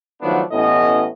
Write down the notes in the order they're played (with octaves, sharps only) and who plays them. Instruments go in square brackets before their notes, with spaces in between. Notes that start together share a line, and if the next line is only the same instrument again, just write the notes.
[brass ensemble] D#3 F3 F#3 A3 B3 D4
A1 A2 B3 C#4 D#5